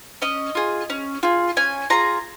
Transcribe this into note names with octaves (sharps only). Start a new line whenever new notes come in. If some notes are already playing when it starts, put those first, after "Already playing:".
C#4 D#5
F4 G#4
C#4
F4 G#4
C#4 G#5
F4 G#4 A#5